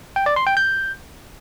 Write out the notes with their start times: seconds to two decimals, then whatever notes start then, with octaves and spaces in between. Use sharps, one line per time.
0.16 G5
0.26 D5
0.36 C6
0.47 G5
0.57 G6